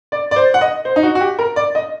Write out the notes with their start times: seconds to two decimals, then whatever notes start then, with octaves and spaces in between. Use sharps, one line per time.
0.12 D5
0.31 D5
0.36 C5
0.54 F#5
0.61 D#5
0.85 C5
0.96 D#4
1.03 F#4
1.15 F#4
1.21 G4
1.39 A#4
1.56 D5
1.75 D#5